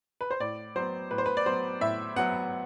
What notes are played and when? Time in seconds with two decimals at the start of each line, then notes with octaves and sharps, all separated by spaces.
0.21 B4
0.31 C5
0.40 A2 D5
0.76 F#3 B3 C5
1.11 A2 B4
1.18 C5
1.26 B4
1.37 D5
1.46 F#3 B3 C5
1.81 A2 E5
2.16 F#3 B3 F#5